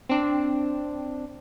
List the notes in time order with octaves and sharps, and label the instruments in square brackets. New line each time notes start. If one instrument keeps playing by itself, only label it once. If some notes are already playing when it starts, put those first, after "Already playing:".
[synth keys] C4 D4